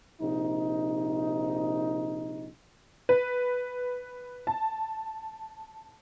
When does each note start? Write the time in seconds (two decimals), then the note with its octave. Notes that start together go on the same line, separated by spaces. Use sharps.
0.22 A#1 C3 D#4
3.09 B4
4.47 A5